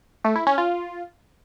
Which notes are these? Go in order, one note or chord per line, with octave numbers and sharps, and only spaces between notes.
A3
E4
C#4
F4